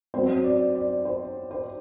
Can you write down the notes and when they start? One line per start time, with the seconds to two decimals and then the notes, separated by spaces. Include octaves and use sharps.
0.14 F#2 F#3 C4 C5
0.44 D5
0.75 D5
1.05 C5
1.51 C5